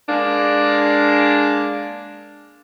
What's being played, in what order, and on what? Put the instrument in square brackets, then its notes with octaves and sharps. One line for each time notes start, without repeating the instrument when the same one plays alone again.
[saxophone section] G#3 A#3 D4